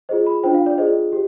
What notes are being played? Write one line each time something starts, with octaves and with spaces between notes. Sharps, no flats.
F4 G#4 C5 D#5
B5
D4 F4 C5 G5
F5
D5
F4 G#4 C5 D#5
G4